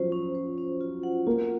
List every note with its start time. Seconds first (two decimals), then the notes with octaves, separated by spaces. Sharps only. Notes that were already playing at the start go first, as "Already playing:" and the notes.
Already playing: F3 F#3 C#4 F4 C5
0.12 C#4
0.35 C5
0.58 C#4
0.81 F4
1.03 F#5
1.27 A#3 F4